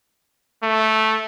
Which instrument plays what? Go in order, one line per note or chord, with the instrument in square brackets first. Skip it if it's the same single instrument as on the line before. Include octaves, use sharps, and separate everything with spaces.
[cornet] A3